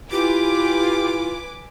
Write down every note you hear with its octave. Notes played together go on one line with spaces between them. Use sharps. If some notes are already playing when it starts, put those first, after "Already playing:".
E4 F4 G4 B4 G#5 D6